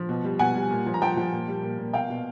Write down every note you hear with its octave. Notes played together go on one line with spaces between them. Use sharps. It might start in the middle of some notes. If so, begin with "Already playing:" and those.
Already playing: F3
B2
G3
B2 F#5 G#5
G3
A#2
F3
A#5
F3 G5 A5
F3
A#2
G3
A#2
A#2
B2 F5 G5
B2